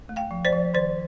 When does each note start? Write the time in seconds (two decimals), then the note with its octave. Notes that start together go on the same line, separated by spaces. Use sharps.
0.09 A3
0.16 F5 G5
0.31 F3
0.45 C5 D5
0.52 F3
0.74 D#3 C5 D5